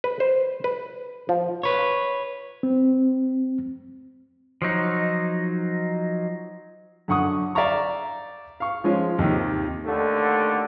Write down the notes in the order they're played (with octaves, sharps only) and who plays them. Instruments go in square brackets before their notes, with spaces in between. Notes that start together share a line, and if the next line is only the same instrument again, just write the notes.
[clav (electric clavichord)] B4
C5
B4
F3
[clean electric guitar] B4 C#5
[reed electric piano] C4
[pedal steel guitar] F3 F#3 D#4
[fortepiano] F#2 D3 F#5 C#6 D#6
D5 E5 F5 G5 A#5 C#6
F5 C#6
F3 G#3 C#4 F4
D#2 C3 D#3
[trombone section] D#2 D3 A3